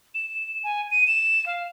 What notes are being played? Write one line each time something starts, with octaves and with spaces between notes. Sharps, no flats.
E7
G#5
D#7
E7
F5